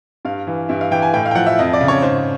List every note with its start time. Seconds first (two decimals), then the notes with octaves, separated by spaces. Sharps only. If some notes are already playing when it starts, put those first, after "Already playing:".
0.25 G2 F5
0.47 E3
0.69 G2 E5
0.81 F5
0.91 E3 G5
1.02 G#5
1.14 A2 G5
1.26 F5
1.31 G5
1.35 F3 F#5
1.47 E5
1.59 F2 D#5
1.73 D5
1.81 C#3
1.88 C#5
2.02 G#2 C5